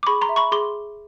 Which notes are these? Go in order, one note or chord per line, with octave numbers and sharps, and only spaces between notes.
D6
G#4 B5 C#6
A#5 C6
E5
B5 C#6
G#4 C6 D6